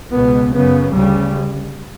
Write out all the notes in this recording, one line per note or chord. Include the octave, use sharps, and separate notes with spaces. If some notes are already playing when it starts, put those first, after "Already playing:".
C#2 B2 B3
F#2 C#3 B3
D2 C#3 G3